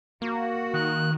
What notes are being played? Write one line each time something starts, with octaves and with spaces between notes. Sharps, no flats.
A#3 F#4
D#3 F#6